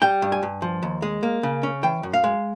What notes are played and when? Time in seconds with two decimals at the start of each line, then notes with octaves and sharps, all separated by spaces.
0.02 G3 G5
0.22 G2
0.32 G#5
0.43 G2
0.62 F3
0.83 D#2
1.02 G#3
1.23 A#3
1.43 C#3
1.63 C#4
1.83 E3 G5
2.03 F#2
2.13 F5
2.24 G#3